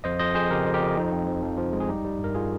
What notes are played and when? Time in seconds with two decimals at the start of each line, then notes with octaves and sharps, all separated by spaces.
0.04 F2 C5 D#5
0.19 F2 C5 D#5
0.35 F2 G#4 C5
0.51 C#3 G4 A#4
0.66 F2
0.74 G4 A#4
0.81 F2
0.96 F2 C4 D#4
1.13 F2
1.27 F3
1.43 F3
1.57 F3
1.73 G#3
1.80 G#4
1.88 G3 D#4 G4
2.05 G3
2.19 G2
2.24 A#4
2.35 F4 G#4